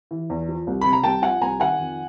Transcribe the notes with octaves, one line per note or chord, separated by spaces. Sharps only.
E3
E2
F3
C2
C3 B5
A#5
C2 G5 A5
F3 F#5 G#5
C2 G#5 A#5
D#3 F#5 G#5
F2